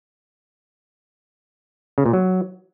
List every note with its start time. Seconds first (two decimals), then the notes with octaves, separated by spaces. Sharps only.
1.98 C#3
2.06 A#2
2.13 F#3